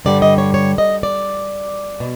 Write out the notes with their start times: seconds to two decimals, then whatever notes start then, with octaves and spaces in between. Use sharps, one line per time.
0.05 G2 D3 G3 D5
0.22 D#5
0.38 C#5
0.54 C#5
0.78 D#5
1.03 D5
2.00 B2